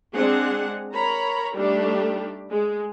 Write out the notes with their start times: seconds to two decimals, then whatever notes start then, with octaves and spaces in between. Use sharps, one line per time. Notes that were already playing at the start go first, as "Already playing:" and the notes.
0.15 G#3 C4 D4 G#4 F#5
0.94 A#4 C#5 A#5 B5
1.56 G3 A3 D4 D#4 G4
2.52 G#3